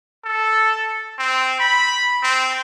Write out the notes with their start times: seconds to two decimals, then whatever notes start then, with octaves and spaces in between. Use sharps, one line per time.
0.25 A4
1.19 C4
1.60 B5
2.23 C4